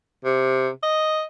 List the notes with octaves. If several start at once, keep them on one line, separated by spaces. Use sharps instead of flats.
C3
D#5